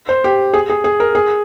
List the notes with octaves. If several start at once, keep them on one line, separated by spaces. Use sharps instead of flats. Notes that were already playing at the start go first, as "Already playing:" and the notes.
C5
G4
G#4
G#4
G#4
A#4
G#4